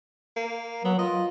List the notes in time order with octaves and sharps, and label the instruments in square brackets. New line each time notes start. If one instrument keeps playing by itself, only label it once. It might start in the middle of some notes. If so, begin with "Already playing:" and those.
[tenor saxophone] A#3
[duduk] F#3 [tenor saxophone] B3
[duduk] F4 [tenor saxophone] D#5